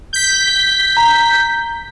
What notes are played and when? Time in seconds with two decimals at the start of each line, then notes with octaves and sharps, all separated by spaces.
0.13 G6 B6
0.97 A#5